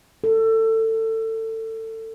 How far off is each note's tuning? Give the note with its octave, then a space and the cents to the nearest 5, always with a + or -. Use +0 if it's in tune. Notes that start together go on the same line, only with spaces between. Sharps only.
A4 +25